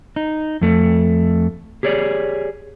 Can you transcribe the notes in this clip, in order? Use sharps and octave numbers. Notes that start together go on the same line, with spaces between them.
D#4
F2 A3
G4 G#4 C#5 D5